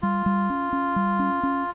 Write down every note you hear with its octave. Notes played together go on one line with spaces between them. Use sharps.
G3 F4
G3
C#4
C#4
G3
C#4
C#4